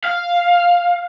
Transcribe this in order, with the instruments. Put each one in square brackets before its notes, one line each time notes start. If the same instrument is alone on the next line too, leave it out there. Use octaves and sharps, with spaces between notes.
[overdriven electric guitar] F5